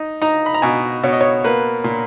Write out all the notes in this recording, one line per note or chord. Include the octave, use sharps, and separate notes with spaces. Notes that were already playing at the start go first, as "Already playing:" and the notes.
Already playing: D#4
D#4 A#5
B5
A#5
B2 G#5
B2 C#5
D#5
C#5
A#3 B4
A#2